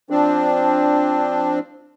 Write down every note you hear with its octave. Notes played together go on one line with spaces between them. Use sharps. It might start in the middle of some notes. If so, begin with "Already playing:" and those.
F3 C4 D4